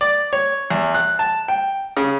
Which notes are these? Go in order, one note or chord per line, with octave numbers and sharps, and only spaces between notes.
D5
C#5
E2
F#6
A5
G5
C#3